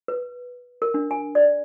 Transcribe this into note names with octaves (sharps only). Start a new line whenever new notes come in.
B4
A#4
D4
G#5
D5